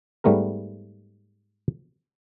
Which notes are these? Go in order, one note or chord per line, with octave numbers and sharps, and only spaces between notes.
G#2 G3 A3 B3 A#4